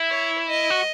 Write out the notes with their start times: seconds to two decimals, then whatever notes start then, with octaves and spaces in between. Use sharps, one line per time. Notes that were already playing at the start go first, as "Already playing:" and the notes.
Already playing: E4
0.10 C#5
0.48 D#5
0.70 F#4